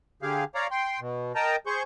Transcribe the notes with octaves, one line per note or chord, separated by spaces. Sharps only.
D3 G4 G#4 F5
C#5 D5 F5 A#5
G5 C6
B2
A#4 D#5 G5 A5 A#5
G#4 C5 C#6 G6